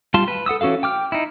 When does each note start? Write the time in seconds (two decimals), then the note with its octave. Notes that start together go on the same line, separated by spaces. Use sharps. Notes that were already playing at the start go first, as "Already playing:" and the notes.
0.14 G3 F4 A5 C6
0.28 B4
0.46 A4 F#5 D#6 E6
0.61 E3 C#4 F#4 A4 F5
0.83 G5 D6 F6
1.12 D#4 E4